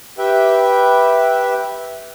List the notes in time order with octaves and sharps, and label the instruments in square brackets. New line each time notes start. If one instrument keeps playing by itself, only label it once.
[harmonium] G4 B4 E5 G5